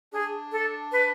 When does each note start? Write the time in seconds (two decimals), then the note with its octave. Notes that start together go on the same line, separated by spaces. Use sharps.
0.13 D4 G#4
0.52 A4
0.92 B4